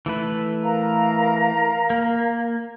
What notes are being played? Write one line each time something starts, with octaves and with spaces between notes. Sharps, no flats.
E3 A3 B4
A#4 F5 A#5
A#3